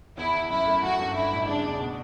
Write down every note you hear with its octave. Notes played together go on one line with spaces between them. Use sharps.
E2 E4
E2
F#2 E4
A3
F#2 F#4
G1
G2 E4
A1
C#3 D4
E2
B2